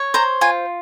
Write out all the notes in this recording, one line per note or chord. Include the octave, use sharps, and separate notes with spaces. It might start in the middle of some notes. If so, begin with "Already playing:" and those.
Already playing: C#5
C5 A#5
F4 G#5